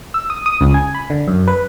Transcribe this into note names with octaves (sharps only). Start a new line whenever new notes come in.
E6
D#6
D#6
C#2
G#5
B5
D3
F#2
B4